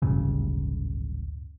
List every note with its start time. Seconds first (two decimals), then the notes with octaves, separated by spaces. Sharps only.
0.02 D1 G#1 G2 C#3